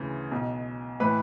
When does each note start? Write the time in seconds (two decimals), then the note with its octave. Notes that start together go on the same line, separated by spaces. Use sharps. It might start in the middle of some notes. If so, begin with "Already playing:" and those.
Already playing: D2 C#3 E3
0.31 B1 B2
1.00 A2 E3 B4